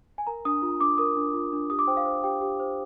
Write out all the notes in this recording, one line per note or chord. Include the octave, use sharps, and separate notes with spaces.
G#5
A#4 A#5
D4 D#6
F4
D4 D6
A#4 D#6
D4
F4
D4
G4 D#6
D6
C5 G5
F5
C5
G4 G5
G4
C5